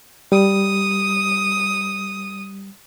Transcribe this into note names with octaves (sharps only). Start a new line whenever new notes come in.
G3 D#6